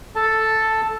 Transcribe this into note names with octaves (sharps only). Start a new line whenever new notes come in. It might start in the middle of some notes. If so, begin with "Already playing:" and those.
A4 A5